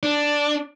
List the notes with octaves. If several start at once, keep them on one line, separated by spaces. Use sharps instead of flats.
D4